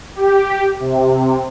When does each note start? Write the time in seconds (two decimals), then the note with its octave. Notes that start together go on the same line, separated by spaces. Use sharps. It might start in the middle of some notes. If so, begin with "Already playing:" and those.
0.15 G4
0.80 C3